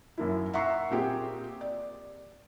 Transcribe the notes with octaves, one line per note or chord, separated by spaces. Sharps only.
F#2 A#3 E4
E5 F#5 A#5 C#6 E6 C7
A#2 C4 G4 G#4
D5